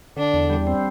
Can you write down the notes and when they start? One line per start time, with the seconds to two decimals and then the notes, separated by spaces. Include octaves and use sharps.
0.16 D3 D4
0.34 E2
0.50 G3
0.67 C4